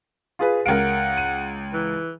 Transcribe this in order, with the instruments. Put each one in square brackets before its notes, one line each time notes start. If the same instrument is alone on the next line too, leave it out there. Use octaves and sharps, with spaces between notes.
[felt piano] F4 G#4 B4
[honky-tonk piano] C#2 D7 [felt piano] A#4 F5 [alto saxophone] F#5
[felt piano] D#7
[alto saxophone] E3